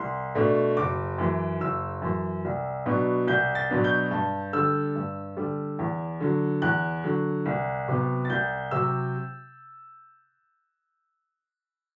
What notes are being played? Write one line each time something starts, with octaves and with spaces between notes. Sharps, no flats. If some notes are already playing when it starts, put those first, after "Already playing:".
Already playing: C2 C6
B2 A3 D4
F#1 D6
F#2 E3
F#1 E6
F#2 E3
C2
B2 F#3 B3 D4
C2 G6
A6
B2 F#3 B3 D4
G6
G2 A5
D3 G3 E6
G2
D3 G3
E2
D3 F#3
E2 F#6
D3 F#3
C2
C3 F#3 B3
A6
C2 G6
C3 F#3 E6